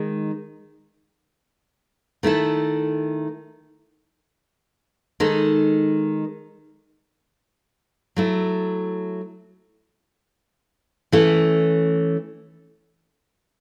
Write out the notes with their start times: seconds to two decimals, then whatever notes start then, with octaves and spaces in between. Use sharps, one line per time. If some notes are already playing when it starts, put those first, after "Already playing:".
Already playing: D#3 G#3 D#4
2.23 D#3 A3 E4 A4
5.20 D#3 G#3 D#4 A4
8.16 F#3 A3 E4
11.12 E3 A3 C#4 E4 A4